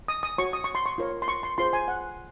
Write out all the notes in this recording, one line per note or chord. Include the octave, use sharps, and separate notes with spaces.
D#6
D#6
F#4 C#5 C#6
D#6
C#6
C6
C#6
F4 A#4 C#5
C6
C#6
C6
F4 G#4 C5 C6
G#5
F#5